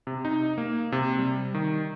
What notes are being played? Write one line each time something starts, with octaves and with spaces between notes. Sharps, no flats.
C3
D#4
A#3
C3
G3
D#3